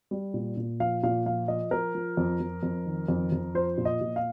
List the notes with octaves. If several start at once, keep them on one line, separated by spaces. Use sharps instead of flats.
G3
A#2
A#2
F3 F5
A#2 F5
F3 F5
F3 D#5
F3 A#4
F3
F2
F2
F2
D#3
F2
F2
F3 C5
A#2
D#5
A#2
F5